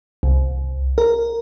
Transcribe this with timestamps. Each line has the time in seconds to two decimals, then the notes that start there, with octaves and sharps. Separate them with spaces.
0.23 C2
0.98 A#4